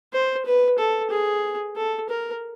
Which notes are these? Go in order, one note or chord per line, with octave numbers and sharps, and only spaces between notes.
C5
B4
A4
G#4
A4
A#4